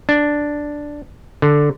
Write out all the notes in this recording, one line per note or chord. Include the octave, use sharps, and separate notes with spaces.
D4
D3